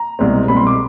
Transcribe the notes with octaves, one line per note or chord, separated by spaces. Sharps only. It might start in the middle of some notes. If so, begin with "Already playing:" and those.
Already playing: A#5
C2 B2 G#3 C4
C2 B2 G#3 C4 B5
C6
D6